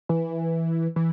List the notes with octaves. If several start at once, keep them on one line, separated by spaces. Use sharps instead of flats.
E3
E3